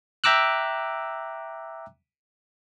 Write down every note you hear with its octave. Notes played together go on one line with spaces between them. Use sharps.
E5 G5 A#5 D6 E6 F#6